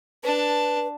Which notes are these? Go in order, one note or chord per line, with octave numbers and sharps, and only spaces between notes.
D4 B4 A5